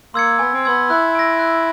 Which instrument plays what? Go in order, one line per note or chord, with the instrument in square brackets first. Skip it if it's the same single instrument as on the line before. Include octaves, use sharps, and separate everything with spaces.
[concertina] A#3 [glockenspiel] C6 E6 G#6 C#7
[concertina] B3 [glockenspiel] G#5
[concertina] C4
[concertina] B3 [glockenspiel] C6 E6 G#6 C#7
[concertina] E4 [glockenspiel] F#6
[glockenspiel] A#6 D7
F#6